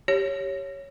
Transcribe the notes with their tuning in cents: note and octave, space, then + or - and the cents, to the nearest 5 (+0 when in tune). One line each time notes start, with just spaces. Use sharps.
G4 +0 C#5 +0